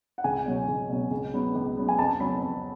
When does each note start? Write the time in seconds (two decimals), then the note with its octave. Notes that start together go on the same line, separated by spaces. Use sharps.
0.18 F#5
0.24 C#2 G#5
0.46 B2 F#3 C#4
0.68 C#2
0.89 B2 F#3 C#4
1.11 C#2
1.34 C#3 F#3 B3
1.55 C#2
1.77 C#3 F#3 B3
1.89 G#5
1.98 F2 A5
2.20 C#3 F#3 B3 B5
2.42 F2